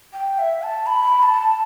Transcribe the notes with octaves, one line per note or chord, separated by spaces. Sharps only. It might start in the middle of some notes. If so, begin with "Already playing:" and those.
G5
E5
A5
B5
A5